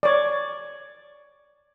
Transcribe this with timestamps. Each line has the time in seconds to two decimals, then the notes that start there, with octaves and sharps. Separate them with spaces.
0.03 C#5 D5